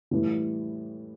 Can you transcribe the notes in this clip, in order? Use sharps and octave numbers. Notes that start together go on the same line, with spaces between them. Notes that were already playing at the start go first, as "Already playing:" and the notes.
A2 E3 G3